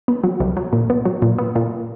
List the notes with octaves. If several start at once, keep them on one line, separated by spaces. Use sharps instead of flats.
B3
F#3
C2
F#3
A#2
B3
F#3
A#2
B3
A#2